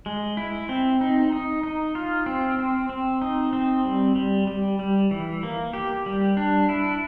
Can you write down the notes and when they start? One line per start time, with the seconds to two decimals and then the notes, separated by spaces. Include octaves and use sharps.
0.06 G#3
0.37 E4
0.69 C4
1.01 D#4
1.32 D#4
1.63 D#4
1.95 F4
2.26 C4
2.59 C4
2.89 C4
3.22 D#4
3.53 C4
3.85 G3
4.16 G3
4.47 G3
4.79 G3
5.11 E3
5.43 A#3
5.73 G4
6.06 G3
6.37 D4
6.69 E4